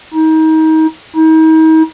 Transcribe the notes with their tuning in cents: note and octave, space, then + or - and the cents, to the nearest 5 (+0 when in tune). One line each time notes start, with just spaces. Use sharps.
D#4 +30
D#4 +40